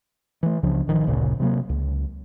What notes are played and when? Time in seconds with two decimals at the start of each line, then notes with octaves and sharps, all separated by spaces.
0.43 E3 A3
0.63 C#2 C#3 F3 D4
0.88 A1 D#3 F3
1.06 G1 D2 A#2 C#3
1.40 C3 F#3 A#3
1.69 C#2